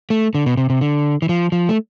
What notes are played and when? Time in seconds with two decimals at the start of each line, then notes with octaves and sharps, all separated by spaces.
0.10 A3
0.35 D3
0.46 B2
0.57 C3
0.70 C3
0.81 D3
1.22 E3
1.29 F3
1.52 F3
1.69 A3